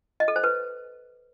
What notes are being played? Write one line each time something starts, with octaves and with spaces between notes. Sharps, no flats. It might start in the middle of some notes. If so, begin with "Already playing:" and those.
D#5
A4
C5
B4